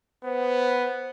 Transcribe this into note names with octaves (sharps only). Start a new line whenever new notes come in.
B3 C5